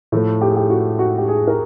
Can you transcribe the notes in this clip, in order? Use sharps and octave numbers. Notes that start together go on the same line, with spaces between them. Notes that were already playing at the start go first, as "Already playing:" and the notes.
A2 F3 A3 A4
G4
G#4
G4
F#4
F#4
G4
G#4
A#4